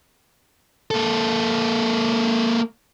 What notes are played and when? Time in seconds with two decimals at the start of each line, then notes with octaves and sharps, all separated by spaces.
0.91 A#3 A4